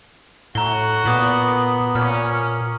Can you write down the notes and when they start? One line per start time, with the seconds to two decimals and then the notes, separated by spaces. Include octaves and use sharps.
0.55 A2 F#4 A#5 G7
1.06 A#2 B3 D6 D#6 F#7
1.95 A#2 C#4 F6